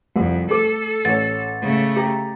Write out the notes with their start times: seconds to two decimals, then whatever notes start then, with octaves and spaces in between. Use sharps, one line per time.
0.16 C2 F2
0.51 A3 A4 D6
1.05 A1 C#5 A6
1.62 C#3 A3
1.96 G4 A#5